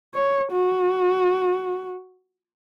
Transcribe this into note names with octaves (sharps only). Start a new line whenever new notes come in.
C#5
F#4